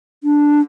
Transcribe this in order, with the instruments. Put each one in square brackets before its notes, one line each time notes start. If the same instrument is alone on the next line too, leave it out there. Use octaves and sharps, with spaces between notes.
[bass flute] D4